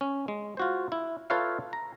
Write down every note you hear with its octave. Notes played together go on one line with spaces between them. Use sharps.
C#4
G#3
F4 F#4 C5
E4
F4 A4 B4 C#5 E5 F5
A#5